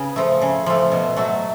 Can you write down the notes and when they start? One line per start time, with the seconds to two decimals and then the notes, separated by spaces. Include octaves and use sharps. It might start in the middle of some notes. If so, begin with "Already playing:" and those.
Already playing: C#3 B4
0.16 F3 A3
0.42 C#3
0.66 F3 A3
0.92 B2
1.17 F#3 A3